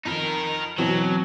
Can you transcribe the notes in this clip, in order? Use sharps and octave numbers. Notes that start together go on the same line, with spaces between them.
F2 D#4 A#4
B2 E3 F#3 C4